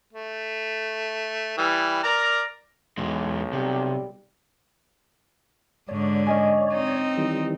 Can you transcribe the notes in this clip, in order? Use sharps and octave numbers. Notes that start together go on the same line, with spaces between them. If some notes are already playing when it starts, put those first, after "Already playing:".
A3
E3 G3
A#4 D5 A#5
B1 E2 G#3
C3 G3
G#2 D3 C#5 D5
C#4 D#5 G#5
C4 D#4
D#3 E3 G3